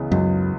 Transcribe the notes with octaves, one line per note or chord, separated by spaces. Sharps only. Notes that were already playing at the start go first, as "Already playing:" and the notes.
Already playing: C#2 C#3 E3 B3
C#2 F#2